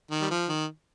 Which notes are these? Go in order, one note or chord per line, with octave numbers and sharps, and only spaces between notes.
D#3
G3
F3
D#3